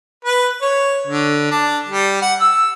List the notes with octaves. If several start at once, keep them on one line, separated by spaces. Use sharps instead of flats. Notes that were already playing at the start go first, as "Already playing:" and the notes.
B4
C#5
D3
D4
G3
F#5
E6